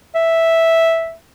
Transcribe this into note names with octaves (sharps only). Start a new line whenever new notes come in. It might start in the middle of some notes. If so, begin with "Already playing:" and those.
E5